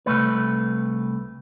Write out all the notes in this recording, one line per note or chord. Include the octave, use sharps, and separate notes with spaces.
C2 F2 A3 B4